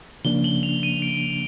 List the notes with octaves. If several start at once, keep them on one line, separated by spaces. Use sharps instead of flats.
C#3 F3 A#3 D4 G7
F#7
F7
D#7
D7